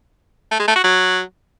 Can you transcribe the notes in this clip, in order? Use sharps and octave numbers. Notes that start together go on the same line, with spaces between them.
A3
G#3
A3
F#4
F#3